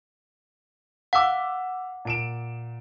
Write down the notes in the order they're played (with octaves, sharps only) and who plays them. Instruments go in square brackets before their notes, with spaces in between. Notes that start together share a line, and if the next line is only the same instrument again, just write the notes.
[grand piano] F5 E6 [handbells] F#5 D6
[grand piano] A#2 D7 E7